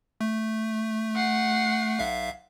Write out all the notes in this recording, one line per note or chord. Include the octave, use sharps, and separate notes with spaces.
A3
F#5 C7
B1 E5 F5